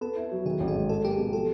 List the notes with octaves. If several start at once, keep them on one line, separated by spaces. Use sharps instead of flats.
B3 A4
E4
F#3
D#3 G#4
A1
G#4
G#2
F#3 A4
A#3 G4
G#4
B2
F3 A4